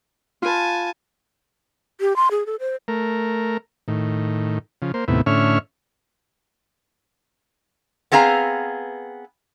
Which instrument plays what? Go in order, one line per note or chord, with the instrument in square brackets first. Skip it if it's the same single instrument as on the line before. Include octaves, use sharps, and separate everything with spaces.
[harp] F4 B4 [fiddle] G#5 A5
[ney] G4
C6
G#4
A4
C5
[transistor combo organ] A3 A#4
A2 D#3
C#3 F3
A#3 C5
D#2 A2 C3 B3 E4
A2 D3 C#4 C#5 E5 F6
[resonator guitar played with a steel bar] B3 C4 G#4 F5 A#5